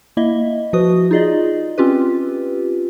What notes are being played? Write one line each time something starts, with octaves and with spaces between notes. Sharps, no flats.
A#3 E4 D#5 E5
F3 F#4 B4 D#6
D#4 F4 G#4 D5 D#5
C4 C#4 F4 G4 B4